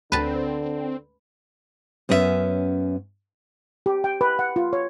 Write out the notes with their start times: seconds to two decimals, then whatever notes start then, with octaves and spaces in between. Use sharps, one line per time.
0.12 D2 D3 C4 B4 A5
2.09 F#2 B3 C#4 F4 E5
3.86 G4
4.04 G5
4.21 B4
4.39 F#5
4.56 F4
4.73 C#5